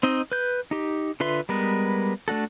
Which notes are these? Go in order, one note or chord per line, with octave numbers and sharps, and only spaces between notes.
C4 D#4 D#5
B4 G6
D#4 G4
D3 F4 B4 E5 C6
G3 G#3 B3 A#4 B4
A3 D4 F#4 A4